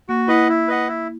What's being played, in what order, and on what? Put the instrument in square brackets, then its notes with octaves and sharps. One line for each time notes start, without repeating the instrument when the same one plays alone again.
[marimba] A#3 [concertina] F#4
[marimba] E4 [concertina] B4 D#5 F#5
[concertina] E4
B4 D#5 F#5
E4